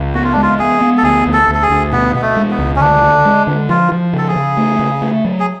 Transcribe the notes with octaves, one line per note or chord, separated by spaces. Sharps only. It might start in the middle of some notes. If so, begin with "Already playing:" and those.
Already playing: C#2
B3 F#4
F4
D4
G#3
F4
B3 G#4
B3
A4
D2 G#4
D2
A4
D2
A4
G#4
D2
B2 B3
B2 B3
A3
G#3
B3
C#2
C#4
D3 D4
D3
G#3
D3
F3 F4
F3
C#3 A4
G#4
C#3
A3
C#3
A3
F#3
G#4